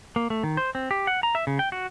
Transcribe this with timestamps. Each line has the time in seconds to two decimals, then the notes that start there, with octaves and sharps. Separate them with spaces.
0.16 A#3
0.30 A3
0.44 D#3
0.57 C5
0.75 C4
0.91 G4
1.07 F#5
1.23 A#5
1.35 E5
1.47 C#3
1.59 G5
1.72 F#4